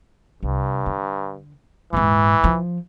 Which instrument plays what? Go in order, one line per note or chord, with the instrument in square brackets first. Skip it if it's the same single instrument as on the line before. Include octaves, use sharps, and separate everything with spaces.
[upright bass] C2 [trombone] G2
[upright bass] D3
[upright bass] D#1 G#2 [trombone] E3
[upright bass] F3